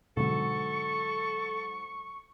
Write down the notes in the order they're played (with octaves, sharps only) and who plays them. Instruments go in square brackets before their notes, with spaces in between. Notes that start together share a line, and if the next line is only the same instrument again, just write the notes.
[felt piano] G#2 F#3 [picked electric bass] B2 D3 [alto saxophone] A4 [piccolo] C#6